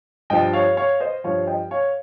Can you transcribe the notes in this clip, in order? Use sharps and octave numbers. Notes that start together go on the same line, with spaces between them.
G2 F3 D#5 G5
C#5 F5
C#5 F5
C5 D#5
G2 F3 C#5 F5
D#5 G5
C#5 F5